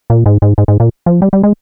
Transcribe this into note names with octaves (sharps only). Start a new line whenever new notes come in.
A#2
G#2
G#2
G#2
G#2
A#2
F3
G3
G3
G#3